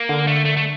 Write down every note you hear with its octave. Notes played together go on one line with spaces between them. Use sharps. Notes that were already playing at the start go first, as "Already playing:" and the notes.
Already playing: A#3
D3
A3
A3
A3